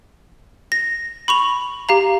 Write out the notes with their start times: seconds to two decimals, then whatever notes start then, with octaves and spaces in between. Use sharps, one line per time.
0.72 A#6
1.28 B5 C#6 F7
1.89 G4 F5 A#5